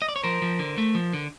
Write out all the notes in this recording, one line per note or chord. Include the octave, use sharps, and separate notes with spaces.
D#5
D5
C#5
F3 A#4 C5
F3
D3
A3
F3
D3